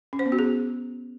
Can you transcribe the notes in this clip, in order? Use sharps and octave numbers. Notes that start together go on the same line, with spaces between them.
C#4
C5
B3
F#4
G#4